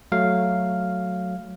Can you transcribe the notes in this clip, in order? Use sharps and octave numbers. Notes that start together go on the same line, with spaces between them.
F#3 A3 F5